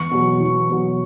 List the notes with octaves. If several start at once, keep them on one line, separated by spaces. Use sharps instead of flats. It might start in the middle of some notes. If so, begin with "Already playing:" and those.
Already playing: E2 C#6
B2 F#3
E2
B2 F#3